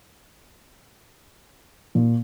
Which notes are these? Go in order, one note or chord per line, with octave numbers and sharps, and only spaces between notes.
A#2